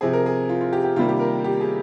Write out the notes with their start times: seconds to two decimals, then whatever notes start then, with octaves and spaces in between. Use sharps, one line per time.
0.01 C3 F3 C4 G#4
0.13 A#4
0.26 G#4
0.49 F4
0.61 F4
0.73 G4
0.84 G4
0.96 C3 D#3 G3 A#3 F4
1.09 G4
1.20 A#4
1.44 G4
1.60 G#4